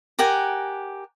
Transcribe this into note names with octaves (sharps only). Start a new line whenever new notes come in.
G4 A#4 F#5 G#5